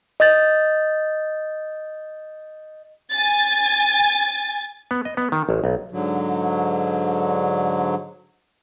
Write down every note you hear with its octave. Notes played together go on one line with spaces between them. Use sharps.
D#5 D#6 G6 A6
G#5 A6
B3
D#5
B3
D#3
A1
B1
G#2 D3 F#3